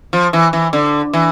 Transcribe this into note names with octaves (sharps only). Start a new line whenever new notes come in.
F3
E3
E3
D3
E3